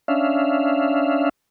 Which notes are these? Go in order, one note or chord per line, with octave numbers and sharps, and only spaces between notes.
C#4 D4 E5 F5